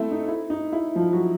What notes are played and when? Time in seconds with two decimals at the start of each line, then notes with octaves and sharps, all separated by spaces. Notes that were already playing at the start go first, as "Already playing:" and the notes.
Already playing: A3 C4 E4 A4
0.11 D#4
0.28 E4
0.50 D#4
0.73 E4
0.95 F3 F4
1.13 F#3 F#4